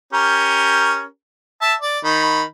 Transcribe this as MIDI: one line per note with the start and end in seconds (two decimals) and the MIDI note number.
0.13 1.05 61
0.13 1.05 67
0.13 1.05 70
1.62 1.74 76
1.62 1.74 81
1.81 1.99 74
2.05 2.43 51
2.05 2.43 83